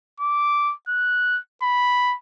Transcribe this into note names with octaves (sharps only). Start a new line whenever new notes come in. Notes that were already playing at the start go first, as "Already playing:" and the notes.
D6
F#6
B5